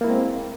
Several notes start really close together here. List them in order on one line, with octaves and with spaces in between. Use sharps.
A#3 E4 G#3 C4